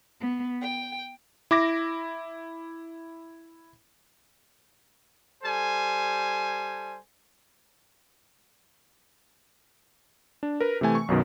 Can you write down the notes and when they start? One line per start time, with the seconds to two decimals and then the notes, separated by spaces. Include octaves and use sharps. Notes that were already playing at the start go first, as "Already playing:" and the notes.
0.21 B3
0.61 G5
1.51 E4 D6 A#6
5.43 G3 A4 C5 G#5
10.43 D4
10.60 A#4 B4
10.81 C3 E3 A3 G#5
10.95 C#6
11.08 B1 F#2 B2 D#3